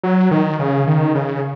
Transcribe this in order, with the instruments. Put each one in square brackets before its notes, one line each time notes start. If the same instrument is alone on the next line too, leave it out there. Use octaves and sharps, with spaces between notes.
[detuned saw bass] F#3
D#3
C#3
D#3
C#3